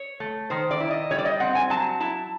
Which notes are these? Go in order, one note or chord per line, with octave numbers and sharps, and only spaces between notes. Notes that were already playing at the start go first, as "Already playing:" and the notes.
Already playing: C#5
A3
D#3 C5
D5
E4
D#5
G3 C#5
D5
D#5
C4 F#5
G#5
F#3 A5
E4 A5